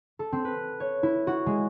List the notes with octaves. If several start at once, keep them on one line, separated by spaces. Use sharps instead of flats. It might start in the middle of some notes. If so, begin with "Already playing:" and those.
A4
C4
B4
C#5
E4
F#4
G#3